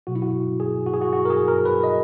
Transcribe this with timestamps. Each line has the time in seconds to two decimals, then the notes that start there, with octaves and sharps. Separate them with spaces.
0.07 B2 F#3 F#4
0.15 E4
0.22 F#4
0.60 G#4
0.86 F#4
0.94 G#4
1.02 F#4
1.13 F#4
1.25 A#4
1.30 G#4
1.48 A#4
1.65 B4
1.83 D#5